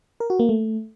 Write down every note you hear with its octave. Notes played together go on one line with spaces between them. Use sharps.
A#4
F#4
A#3
A3